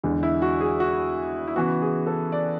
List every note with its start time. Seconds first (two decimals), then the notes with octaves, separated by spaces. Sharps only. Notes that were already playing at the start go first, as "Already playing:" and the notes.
0.04 E2 D3 G#3
0.23 E4
0.42 F#4
0.61 G#4
0.80 F#4
1.47 E4
1.56 C#3 E3 B3 F#4
1.82 G#4
2.07 A4
2.32 D5